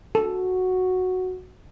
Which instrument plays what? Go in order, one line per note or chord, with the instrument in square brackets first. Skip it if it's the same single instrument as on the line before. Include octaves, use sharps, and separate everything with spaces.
[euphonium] F#4 [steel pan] A4